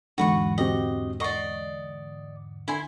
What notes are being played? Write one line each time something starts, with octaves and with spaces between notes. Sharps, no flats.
E2 G#2 D3 F#4 B4 C#6
C4 F#4 G4 D#5
D5 D#5 F#5 C#6 C7
D3 E4 G#5 C6